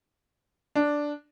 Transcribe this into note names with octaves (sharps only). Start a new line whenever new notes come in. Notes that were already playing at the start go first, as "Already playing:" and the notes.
D4